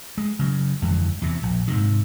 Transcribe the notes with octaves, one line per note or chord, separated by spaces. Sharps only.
G#3
C#3 F#3
G1 F2 E3 G#3
E2 C3
A#1
G#2 C3 D#3